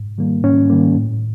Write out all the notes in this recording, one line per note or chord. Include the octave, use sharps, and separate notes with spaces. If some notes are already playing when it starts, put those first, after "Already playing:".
Already playing: G#2
D#3 G3 A#3
G#2 C#4
D#3 G3 A#3
A2